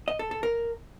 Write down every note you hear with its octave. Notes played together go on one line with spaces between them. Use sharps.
D#5
A4
A4
A#4